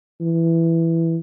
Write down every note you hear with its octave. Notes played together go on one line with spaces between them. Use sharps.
E3